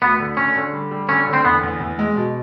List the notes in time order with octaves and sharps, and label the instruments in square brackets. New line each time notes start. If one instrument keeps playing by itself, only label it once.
[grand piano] D2 [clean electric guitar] B3
[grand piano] D3
[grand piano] D3 [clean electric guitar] C#4
[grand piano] D3
G3
G3
[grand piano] D3 [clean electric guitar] C#4
[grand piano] D3
[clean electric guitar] C4
[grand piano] E2 [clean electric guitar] B3
[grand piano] E2
E2
G#3
B2